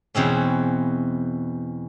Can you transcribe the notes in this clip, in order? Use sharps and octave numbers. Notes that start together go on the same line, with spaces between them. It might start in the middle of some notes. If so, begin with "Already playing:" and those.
E2 B2 C4 C#4